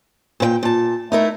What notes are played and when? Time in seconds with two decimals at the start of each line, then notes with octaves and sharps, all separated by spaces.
0.40 A#2 C5 G5
0.63 A#2 A5
1.12 A3 D#4 E4 A#4